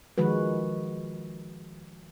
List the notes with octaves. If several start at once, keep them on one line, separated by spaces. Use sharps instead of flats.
D#3 F3 G#3 F#4 B4